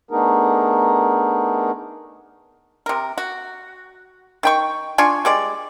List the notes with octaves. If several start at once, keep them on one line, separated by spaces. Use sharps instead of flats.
A3 B3 D4 D#4 G#4 A#4
C3 A#4
F#4
D#3 G5 C#6
D4 F4 G#5 C#6
G3 G#3 D5